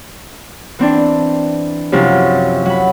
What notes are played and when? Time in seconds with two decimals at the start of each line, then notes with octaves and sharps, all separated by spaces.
0.79 E3 C4 D4
1.92 F#2 C3 F3 F#3 C#4 E4
2.66 F#3 B5